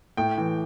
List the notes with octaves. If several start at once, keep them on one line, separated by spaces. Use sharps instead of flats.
A2 G5
E3